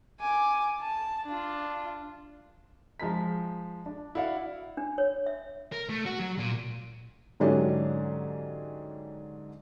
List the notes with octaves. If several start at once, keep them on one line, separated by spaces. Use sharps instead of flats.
G#5 D6
A5
D4 F4
F3 G#3 A#5 B6
D4
E4 F#4 D5 F5 F#5
D4
C#5
E5
A#4
A3
F#4
F#3
A#2
G#2 D3 F#3 C#4 D4 G4